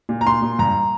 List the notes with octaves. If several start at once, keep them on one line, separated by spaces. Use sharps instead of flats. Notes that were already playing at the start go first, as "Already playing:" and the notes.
A#2
A#5
A#2 C6
A#2
G2 A#5